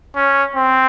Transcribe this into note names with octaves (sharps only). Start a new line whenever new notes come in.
C#4
C4